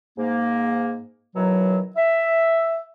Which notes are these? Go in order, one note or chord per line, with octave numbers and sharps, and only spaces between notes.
G#2 A#3
B2 D#3 E3 F#3
E5